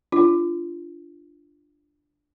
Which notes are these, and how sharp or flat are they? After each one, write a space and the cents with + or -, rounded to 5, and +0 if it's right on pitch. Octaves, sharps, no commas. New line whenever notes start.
D4 +0 F4 -20